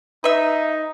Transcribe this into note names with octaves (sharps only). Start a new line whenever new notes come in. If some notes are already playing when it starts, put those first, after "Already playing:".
D#4 B4 E5